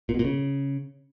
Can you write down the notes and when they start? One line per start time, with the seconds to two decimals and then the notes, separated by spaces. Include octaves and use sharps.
0.09 A#2
0.14 B2
0.19 A#2
0.25 C#3